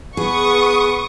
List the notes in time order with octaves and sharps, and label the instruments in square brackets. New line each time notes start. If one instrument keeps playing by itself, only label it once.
[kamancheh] B3 [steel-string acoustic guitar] G#4 [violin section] C#6 D#6